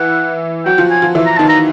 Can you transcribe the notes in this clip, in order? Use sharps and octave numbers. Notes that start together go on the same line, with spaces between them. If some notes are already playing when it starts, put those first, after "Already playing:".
Already playing: E3 E4 F#5
F#3 F#4 G5
F3 F4
G#5
F3 F4
E3 E4
A#5
D#3 D#4 A5
A#5